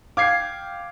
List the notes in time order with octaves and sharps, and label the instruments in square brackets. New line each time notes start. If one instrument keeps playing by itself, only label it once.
[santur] F5 G5 [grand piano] D6 G#6 C7